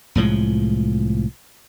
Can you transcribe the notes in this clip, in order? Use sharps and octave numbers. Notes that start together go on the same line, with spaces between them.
C2 A2 F3 G#3